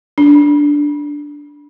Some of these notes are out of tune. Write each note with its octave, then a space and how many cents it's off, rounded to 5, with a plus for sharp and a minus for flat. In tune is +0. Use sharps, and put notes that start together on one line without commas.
D4 -5